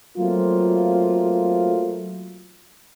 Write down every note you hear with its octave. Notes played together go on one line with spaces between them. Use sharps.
F#3 A3 A#3 C4 F4